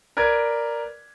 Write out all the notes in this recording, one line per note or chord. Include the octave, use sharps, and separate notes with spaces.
A#4 B4 D5 G#6